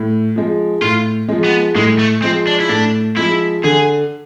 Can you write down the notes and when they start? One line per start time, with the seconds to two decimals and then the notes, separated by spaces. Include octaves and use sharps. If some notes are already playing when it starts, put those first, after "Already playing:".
Already playing: A2
0.36 F3 G#3
0.82 A2 F4
1.28 F3 G#3
1.44 B3
1.75 A2 G#3
1.99 A3
2.22 F3 G#3 C4
2.47 D4
2.60 E4
2.69 A2 D4
3.16 F3 G#3 E4
3.64 D3 G#4